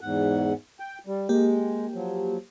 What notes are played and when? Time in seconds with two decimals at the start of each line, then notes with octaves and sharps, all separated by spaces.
0.01 E2 G#2 F#5
0.80 G5
1.07 G3
1.29 G#3 A#3 G4
1.94 F3 F#3